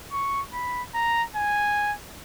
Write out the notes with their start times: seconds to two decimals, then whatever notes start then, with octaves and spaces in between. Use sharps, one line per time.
0.13 C#6
0.54 B5
0.94 A#5
1.36 G#5